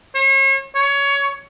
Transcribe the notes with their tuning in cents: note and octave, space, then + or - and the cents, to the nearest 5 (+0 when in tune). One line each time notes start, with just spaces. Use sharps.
C#5 -40
C#5 +20